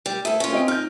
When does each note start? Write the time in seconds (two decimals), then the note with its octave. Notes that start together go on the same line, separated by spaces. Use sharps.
0.06 G3
0.25 D2 A4 E5
0.40 C#4 F4
0.52 C4 D#5 D7
0.68 D#4 F6 G6